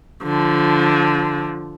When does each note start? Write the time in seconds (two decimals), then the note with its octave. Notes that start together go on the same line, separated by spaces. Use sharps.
0.23 D3 F3